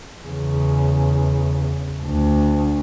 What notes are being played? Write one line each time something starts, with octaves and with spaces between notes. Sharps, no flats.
E2 C#3
D2